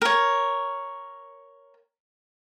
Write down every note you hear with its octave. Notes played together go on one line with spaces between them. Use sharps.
A#4 C#5